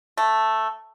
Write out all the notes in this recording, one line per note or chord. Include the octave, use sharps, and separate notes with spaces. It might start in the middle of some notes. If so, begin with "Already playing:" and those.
A3